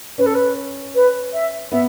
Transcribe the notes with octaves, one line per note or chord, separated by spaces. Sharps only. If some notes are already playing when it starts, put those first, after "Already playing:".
C#4 B4
A4
B4
B4
E5
B3 E5